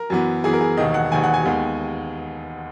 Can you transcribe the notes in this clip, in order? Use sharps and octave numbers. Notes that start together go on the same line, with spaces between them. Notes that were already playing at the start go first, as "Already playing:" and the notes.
Already playing: A#4
F#2 E3 B3
F#2 E3 B3 G#4
A#4
G#4
E1 D#2 D#3 D#5
F#5
E1 D#2 D#3 G#5
F#5
G#5
D#2 D#3 G#3 B3